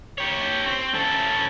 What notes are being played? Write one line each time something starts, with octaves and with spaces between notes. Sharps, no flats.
G4 C#5
C4
C#4 A4